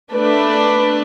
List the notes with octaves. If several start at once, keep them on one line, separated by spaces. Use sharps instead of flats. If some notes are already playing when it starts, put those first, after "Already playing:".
A3 D4 B4 D5